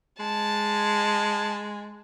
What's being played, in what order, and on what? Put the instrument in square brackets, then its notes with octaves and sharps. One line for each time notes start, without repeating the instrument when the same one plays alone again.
[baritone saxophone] G#3 [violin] A5